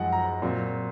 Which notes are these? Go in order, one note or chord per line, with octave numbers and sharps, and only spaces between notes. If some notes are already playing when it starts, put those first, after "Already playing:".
Already playing: F#2 F3 G#3 D#4 F#5
A#5
A#2 F#3 C4 F4